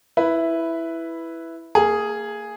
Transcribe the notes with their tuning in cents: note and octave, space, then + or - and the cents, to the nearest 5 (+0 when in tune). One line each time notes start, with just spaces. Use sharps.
E4 +0 B4 +0
A#3 -30 G#4 +0